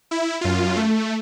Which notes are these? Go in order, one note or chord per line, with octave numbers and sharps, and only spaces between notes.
E4
F#2 F4
A3